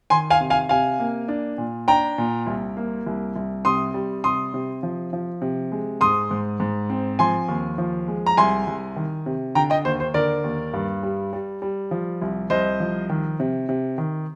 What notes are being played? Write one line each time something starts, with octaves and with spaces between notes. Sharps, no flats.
D#3 G#5 C6
F5 G#5
C3
F5 G#5
C3 F5 G#5
A#3
D4
A#2
D4 G5 A#5
A#2
C2
A#3
C2
C2
C3 C6 D#6
G3
C3 C6 D#6
C3
F3
F3
C3
G#3
G#2 C6 D#6
G#2
G#2
C4
F3 G#5 C6
D#2
F3
G#3
A#5
C2 G#5 C6
C2
D#3
C3
D3 G5 A#5
D#5 G5
D#2 C5
C5
D3 A#4 D5
D#2
G2
G3
G3
G3
F3
C2
C2 C5 D#5
F3
D#3
C3
C3
D#3